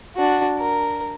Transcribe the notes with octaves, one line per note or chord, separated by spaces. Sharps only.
D4 F#4
A#4